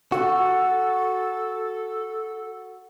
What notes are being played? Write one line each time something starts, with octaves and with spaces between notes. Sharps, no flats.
F#4 A4